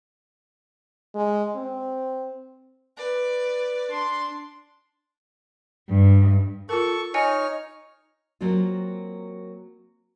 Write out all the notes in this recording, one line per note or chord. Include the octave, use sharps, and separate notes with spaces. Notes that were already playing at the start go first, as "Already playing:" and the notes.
G#3
C4
B4 D5
D4 C6
G2
F4 A4 A#4 C#6
D#4 C#5 D#5 G#5 F6 C#7
F#3 A#3 C4 F4